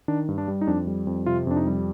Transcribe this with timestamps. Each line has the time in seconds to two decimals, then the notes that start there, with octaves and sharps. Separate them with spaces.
0.08 D#3 D4
0.28 G2
0.38 D4
0.48 G3
0.61 D#4
0.67 F2 D4
0.87 G3
1.07 F2
1.26 C3 F4
1.47 F2 D4
1.57 D#4
1.67 G3